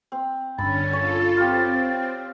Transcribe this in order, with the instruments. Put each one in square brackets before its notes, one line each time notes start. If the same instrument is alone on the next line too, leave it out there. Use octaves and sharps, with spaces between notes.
[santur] C4
[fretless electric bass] G1 G2 [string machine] D3 C#4 [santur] B5 E6 [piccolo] A6
[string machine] F4 A4 [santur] C#5
[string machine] C4 [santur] F4 G4